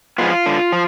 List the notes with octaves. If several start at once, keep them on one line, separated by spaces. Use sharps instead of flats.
F3 G#3 B3 F4
D3
F3